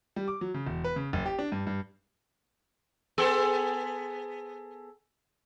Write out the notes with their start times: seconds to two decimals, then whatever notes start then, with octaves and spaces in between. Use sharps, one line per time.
0.16 G3
0.28 D6
0.41 F#3
0.54 C#3
0.67 E1
0.84 B4
0.96 C#3
1.13 F#1
1.26 G4
1.39 D4
1.52 G2
1.67 G2
3.18 B3 G#4 A4